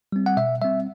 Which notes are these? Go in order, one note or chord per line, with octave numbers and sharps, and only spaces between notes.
G3 C4
F#5
B2 E5
G3 C4 E5